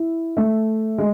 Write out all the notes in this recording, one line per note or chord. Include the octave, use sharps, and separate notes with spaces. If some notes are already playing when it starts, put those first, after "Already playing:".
Already playing: E4
A3
G#3